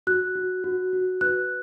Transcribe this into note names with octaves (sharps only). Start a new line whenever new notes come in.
F#4 F#6
F#4
F#4
F#4
B4 F#6